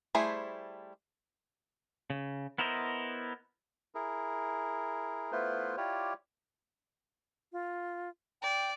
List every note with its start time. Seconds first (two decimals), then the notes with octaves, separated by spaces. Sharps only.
0.15 G3 A3 E4 G#4 C5
2.10 C#3
2.58 B3 E4 A#4 C5 D#5
3.95 E4 G#4 A#4
5.32 A3 B3 E4 F4 B4 C5
5.77 E4 F4 G4 C#5 D5
7.53 F4
8.42 D5 G5